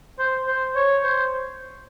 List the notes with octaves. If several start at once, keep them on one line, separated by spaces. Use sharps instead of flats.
C5
C5
C#5
C5